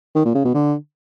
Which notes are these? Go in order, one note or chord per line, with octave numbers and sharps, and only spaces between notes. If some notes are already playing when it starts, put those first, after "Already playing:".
D#3
A#2
C#3
B2
D3